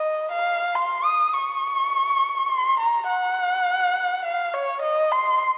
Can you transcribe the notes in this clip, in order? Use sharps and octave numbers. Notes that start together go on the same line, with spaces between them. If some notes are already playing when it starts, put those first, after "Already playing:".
Already playing: D#5
F5
C6
D#6
C#6
C6
A#5
F#5
F5
C#5
D#5
C6